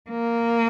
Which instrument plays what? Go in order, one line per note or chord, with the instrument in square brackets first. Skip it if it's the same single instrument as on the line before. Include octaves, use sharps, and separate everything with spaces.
[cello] A#3